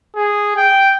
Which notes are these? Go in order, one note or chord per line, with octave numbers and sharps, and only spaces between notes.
G#4
G5